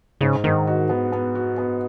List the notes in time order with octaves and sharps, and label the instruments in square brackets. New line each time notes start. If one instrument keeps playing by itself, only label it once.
[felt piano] G#2 [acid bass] C#3
[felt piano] G#2 [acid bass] D#3
[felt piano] F#4
B3
B3
F#4
B3